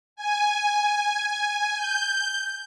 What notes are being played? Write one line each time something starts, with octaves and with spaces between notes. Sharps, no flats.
G#5
G6